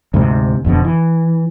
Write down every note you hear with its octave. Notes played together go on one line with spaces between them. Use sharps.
D2 G#2 C3
E1 F2 B2 D3
E3